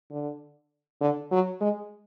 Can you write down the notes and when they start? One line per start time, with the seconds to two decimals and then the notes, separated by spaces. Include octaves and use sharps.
0.11 D3
1.01 D3
1.31 F#3
1.61 G#3